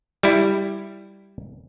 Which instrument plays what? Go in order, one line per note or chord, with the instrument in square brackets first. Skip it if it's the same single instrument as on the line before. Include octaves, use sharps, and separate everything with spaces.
[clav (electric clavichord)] G3 E4